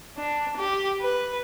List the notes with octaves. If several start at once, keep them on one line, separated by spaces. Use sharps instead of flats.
D4
G4
B4